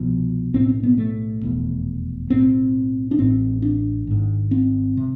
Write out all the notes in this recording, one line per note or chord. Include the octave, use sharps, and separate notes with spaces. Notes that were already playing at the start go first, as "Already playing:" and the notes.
Already playing: C2 B2 F3
B1 A2 C4
C4
B3
A3
F1 E2 B2
B1 A2 C4
D4
A1 A2 C4
D4
G#1 G#2
C4
C3